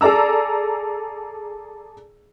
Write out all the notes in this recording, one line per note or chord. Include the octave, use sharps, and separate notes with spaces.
G#4 A4 D5 A#5 E6